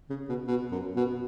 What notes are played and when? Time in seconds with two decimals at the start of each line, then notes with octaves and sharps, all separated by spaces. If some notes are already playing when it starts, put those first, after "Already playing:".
0.10 C#3
0.29 B2
0.48 B2
0.72 F#2
0.96 B2